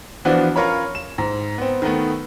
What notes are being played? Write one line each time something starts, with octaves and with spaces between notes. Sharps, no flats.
E3 F3 B3 D4 F#4
C#4 F4 A#4 C#5 B5
E7
G#2
B3 C4
D#3 A3 B3